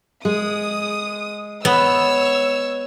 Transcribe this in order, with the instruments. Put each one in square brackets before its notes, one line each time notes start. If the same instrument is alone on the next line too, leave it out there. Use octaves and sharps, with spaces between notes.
[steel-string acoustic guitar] G#3 [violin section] D#6
[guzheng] B3 [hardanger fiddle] C#5 [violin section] E6